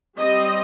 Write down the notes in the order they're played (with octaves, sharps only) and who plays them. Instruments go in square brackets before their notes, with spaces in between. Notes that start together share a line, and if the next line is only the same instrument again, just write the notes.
[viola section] G3 C4 D#5